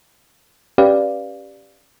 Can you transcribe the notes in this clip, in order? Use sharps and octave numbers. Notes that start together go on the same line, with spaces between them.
C#4 G4 B4 D5 F5